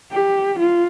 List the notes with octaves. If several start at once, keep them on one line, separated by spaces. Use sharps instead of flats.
G4
F4